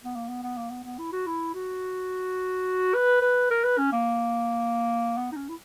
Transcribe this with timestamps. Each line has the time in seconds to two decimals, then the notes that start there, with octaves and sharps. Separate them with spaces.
0.04 B3
0.16 A#3
0.29 B3
0.43 B3
0.58 A#3
0.71 B3
0.85 B3
0.99 E4
1.12 F#4
1.27 E4
1.54 F#4
2.94 B4
3.22 B4
3.50 A#4
3.64 B4
3.78 C#4
3.93 A#3
5.17 B3
5.32 D#4
5.36 C#4
5.49 E4